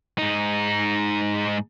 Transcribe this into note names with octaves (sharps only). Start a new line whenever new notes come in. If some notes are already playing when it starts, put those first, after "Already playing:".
G#2 D#4